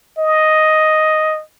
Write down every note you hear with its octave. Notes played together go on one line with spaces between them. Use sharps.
D#5